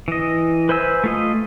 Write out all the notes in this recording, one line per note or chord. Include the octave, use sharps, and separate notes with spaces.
E3 D#5
B4 C5 E5 G#5 E6
A3 F4 D#5